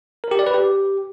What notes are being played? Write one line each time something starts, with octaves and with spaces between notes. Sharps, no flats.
A#4
G4
D5
B4
G4